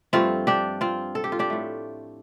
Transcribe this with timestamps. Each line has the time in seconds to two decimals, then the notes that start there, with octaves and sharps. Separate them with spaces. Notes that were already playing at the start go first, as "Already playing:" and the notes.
0.13 G2 F3 A3 C4 F4
0.47 D4 G4
0.81 C4 F4
1.15 A4
1.24 G4
1.32 F4
1.39 D4 G4
1.50 A2 A3